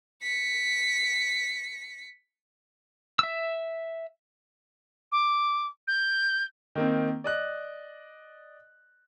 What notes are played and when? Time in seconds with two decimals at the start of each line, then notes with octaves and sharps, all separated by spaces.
0.22 B6 C#7
3.19 E5 E6
5.11 D6
5.87 G6
6.75 D#3 A#3 C4
7.24 D5 D#5 F#6